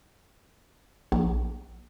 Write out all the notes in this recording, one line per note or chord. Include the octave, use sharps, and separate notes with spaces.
A#1